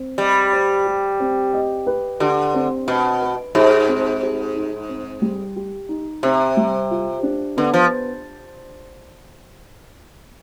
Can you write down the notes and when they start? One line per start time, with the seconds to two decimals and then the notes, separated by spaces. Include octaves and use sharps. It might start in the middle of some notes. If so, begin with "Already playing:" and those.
Already playing: C4
0.18 G3 D#5
0.53 C5
0.86 G4
1.20 C4
1.53 D#5
1.86 B4
2.20 D3 G4
2.54 C4
2.87 B2 D#5
3.21 B4
3.55 G#2 G4
3.88 C4
4.22 G4
4.56 D#4
4.89 C4
5.22 G3
5.56 G4
5.89 D#4
6.23 C3 C4
6.57 G3
6.91 F4
7.23 D4
7.57 D3 B3
7.74 F3